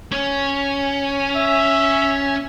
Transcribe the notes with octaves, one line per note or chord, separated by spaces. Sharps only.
C#4
E5